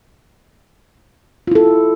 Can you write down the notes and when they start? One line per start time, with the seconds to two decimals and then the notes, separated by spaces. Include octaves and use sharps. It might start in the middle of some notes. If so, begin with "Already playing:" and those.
1.47 F4
1.51 E4
1.55 A4